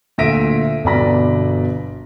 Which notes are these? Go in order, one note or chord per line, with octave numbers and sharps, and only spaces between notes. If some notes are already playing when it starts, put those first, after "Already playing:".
D2 A#2 E5 A#6 D7 D#7
G1 B2 D5 B5 A#6